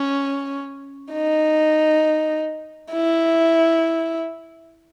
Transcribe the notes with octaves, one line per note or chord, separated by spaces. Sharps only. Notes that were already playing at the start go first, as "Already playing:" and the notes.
Already playing: C#4
D#4
E4